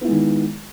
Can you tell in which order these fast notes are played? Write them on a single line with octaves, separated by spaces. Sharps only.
B3 E4 G#3 D#3